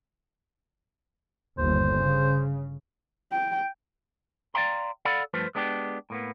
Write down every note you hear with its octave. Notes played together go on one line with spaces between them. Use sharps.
G1 D#2 C5
C#3
G5
D5 E5 F5 G5 A#5 C6
A4 D5 F5 F#5 B5
G2 F3 A3 F4 B4 C5
G#3 B3 D4 G4
A2 A#3 B3